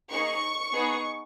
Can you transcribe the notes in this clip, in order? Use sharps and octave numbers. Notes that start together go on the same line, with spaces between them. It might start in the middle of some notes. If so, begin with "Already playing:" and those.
A#3 D#4 G#4 C#6
B3 D#4 G#4